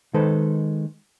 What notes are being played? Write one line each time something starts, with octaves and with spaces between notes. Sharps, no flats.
D#3 G#3 D#4 A4 B4 C5